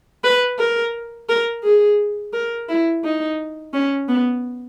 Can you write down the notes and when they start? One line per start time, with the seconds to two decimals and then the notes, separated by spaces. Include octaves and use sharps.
0.24 B4
0.59 A#4
1.29 A#4
1.64 G#4
2.33 A#4
2.69 E4
3.04 D#4
3.74 C#4
4.09 B3